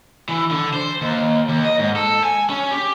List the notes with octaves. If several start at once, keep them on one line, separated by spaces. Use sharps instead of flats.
E3
D3
C5
D#2
D#2
D#5
G#2
A4
G#5
C#4
G4